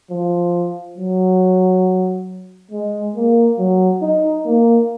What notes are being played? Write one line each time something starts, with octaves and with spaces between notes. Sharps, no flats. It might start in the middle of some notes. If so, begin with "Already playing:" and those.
F3
F#3
G#3
A#3
F#3
D#4
A#3